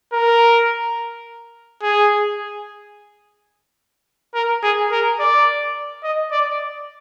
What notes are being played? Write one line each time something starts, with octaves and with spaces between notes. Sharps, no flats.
A#4
G#4
A#4
G#4
A#4
D5
D#5
D5